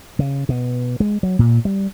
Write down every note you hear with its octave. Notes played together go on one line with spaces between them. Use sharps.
C#3
B2
G#3
F#3
A#2
G3